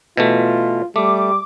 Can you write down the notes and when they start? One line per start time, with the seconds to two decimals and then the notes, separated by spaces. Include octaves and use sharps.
0.17 B2 E3 A3 F4
0.96 G3 A3 D6